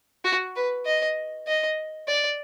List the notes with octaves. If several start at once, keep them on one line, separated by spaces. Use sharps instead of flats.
F#4
B4
D#5
D#5
D5